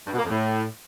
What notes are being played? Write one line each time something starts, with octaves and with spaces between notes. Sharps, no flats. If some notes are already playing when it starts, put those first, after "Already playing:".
G2
B2
A#3
F2
A2